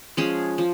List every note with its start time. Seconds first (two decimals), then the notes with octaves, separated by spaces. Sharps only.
0.17 F3 G#3 C#4 G#4
0.58 F3